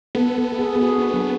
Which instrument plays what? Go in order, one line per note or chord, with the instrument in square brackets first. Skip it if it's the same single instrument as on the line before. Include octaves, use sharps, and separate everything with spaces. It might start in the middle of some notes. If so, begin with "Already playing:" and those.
[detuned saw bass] B3 [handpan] A4
[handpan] A4
A4
G#4
G#4
F#4
D4
F#3